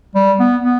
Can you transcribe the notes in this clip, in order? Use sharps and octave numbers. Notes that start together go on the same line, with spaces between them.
G3
B3
B3